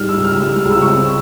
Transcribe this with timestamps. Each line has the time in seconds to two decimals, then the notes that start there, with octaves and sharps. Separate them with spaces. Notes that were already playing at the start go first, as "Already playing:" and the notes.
Already playing: G#2 G3 F6
0.09 E6
0.17 C#2
0.24 F6
0.41 G3 E6
0.56 F6
0.65 C#2
0.72 E6
0.81 C#6
0.88 C4 E6